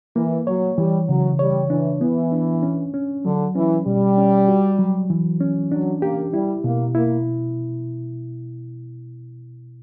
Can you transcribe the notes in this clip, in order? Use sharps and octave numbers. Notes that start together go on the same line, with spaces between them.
E3 A#3
F#3 C#5
E3 G3
C#3 F#3
G3 C#5
E3 D4
E3 B3
D4
C#4
C#4
D3 F#3
E3 C#4
B2 G3
C#4
F#4
F#3
E3
C#4
F#3 D4
A#3 G4
G3 E4
B2 A#3
A#3 E4